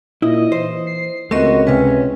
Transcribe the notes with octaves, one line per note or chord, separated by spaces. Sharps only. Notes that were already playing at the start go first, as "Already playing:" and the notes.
A#2 E4 D#5
E3 C5
C7
C#2 A3 B3 C4 F#4 A#4 D#5
C2 C3 C#4 B4